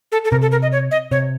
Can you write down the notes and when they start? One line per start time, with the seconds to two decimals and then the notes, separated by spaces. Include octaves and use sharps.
0.12 A4
0.25 A4
0.31 C3 A#4
0.42 A4
0.52 A#4
0.62 D#5
0.72 C#5
0.91 D#5
1.11 C3 C#5